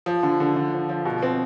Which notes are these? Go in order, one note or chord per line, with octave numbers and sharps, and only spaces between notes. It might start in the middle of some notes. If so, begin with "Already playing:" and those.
F3
D3
D3
D3
F3
F3
B2
C4